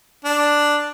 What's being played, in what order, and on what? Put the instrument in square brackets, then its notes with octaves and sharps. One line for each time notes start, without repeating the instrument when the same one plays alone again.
[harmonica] D4